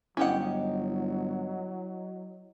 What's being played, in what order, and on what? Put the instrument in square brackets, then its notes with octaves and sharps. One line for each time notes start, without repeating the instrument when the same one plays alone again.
[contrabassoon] G1 [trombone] F#3 [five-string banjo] C#4 G4 F#5 [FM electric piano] E4 D#5